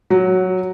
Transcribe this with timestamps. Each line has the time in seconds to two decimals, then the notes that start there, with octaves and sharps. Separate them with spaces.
0.10 F#3